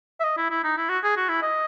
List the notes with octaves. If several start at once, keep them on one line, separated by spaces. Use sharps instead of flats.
E5
D#5
E4
E4
D#4
E4
F#4
G#4
F#4
E4
D#5